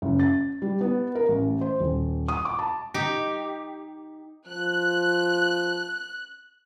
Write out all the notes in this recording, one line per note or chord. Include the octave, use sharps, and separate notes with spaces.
F#1
A6
G3
B3
A#4
A1
C5
D#1
D#6
D6
A5
D#4 G4
F3 F#6